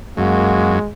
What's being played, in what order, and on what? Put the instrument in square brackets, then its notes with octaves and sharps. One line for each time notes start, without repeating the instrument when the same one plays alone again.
[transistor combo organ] F#2 [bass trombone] G#3 [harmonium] A#3 F#4